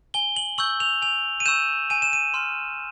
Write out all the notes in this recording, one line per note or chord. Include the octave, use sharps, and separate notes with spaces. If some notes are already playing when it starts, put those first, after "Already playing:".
G#5 G7
F#7
C#6 E6 G6 F#7
F7
G#5 F7
D#7
C#6 E6 G6 E7
G#5 D#7
E7
D#7
C6 F6